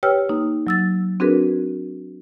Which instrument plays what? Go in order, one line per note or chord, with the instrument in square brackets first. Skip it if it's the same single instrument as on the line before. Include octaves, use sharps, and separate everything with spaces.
[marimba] G4 B4 C#5 G5 E6 F6
A#3 D#4
F#3 E6 A6
C4 D4 F#4 G#4 A#4 B4